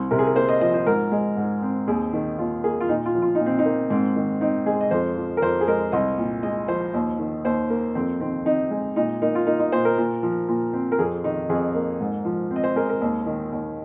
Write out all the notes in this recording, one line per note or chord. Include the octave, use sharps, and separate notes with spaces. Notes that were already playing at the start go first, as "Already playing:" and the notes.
Already playing: C2
C3 A#4
G#4
A#4
A#3 C5
D#5
F3 D#5
C5
G#2 A#4
G#3
G#2
C4
D#2 G#4
D#3
D#2 F4
A#3 G#4
F4
A#2 D#4
F4
F3
F4
A#2 D#4
C4
D#4
A#3
G#2 C4
D#3
C4 D#4
G#3 G#4
D#5
F2 C5
F3
A#4
F2 C5
G#4
G#3 A#4
C2 D#5
A#2
G#3 D#5
F3 C5
D#2
D#3
D#2 C5
A#3
F2 C4
D#3 C4
C4 D#4
G#3
A#2 D#4
A#3 D#4
F4
A#3 D#4
D#4
A#2 C5
A#4
A#2
F3
A#2
C4
A#4
F2 G#4
D#3 D#4
F2 G#4
A#3
G#2
F3
C4
D#5
C5
G#3 A#4
A#4
D#2
D#3
D#2